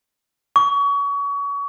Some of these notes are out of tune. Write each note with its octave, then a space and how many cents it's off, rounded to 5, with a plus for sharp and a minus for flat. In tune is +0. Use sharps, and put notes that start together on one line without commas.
C#6 +30